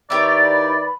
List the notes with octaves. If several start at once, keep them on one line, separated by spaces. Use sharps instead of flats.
D#3 D#4 E4 G4 B4 C#5 D5 B5